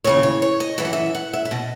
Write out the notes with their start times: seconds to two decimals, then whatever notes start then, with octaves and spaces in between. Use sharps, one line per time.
0.04 D#2 C#3 E3 C#5
0.23 C#5
0.42 C#5
0.60 D#5
0.78 F#2 E3 E5
0.85 F#5
0.93 E5
1.15 F#5
1.33 E5
1.45 E5
1.51 B2 D#5